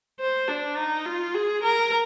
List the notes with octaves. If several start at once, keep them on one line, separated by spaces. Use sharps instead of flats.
C5
D4
D#4
F4
G#4
A#4